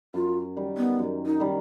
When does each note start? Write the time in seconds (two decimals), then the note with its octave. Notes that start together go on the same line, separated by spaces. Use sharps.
0.14 F#2 F4
0.57 D#3 G3
0.77 B3
0.99 F#2
1.26 D#4
1.40 D#3 G3